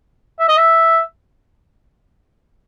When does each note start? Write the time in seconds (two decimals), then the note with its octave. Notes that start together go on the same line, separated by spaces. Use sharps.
0.40 E5
0.48 D#5
0.57 E5